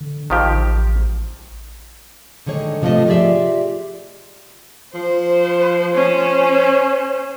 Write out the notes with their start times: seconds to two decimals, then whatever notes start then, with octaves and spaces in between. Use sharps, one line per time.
0.01 D3
0.30 A1 D#3 F3 G4
2.46 D3 D#3 G#3 C#5
2.82 C3 F3 A3 B3 D#5
3.07 F4 G4 G#4 D5 E5
4.94 F3 C5
5.94 C#4 C5